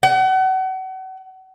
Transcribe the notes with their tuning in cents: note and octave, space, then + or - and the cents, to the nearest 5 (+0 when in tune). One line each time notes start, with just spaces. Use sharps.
F#5 +35